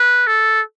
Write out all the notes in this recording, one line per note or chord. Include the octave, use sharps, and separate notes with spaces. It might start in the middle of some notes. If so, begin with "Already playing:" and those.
Already playing: B4
A4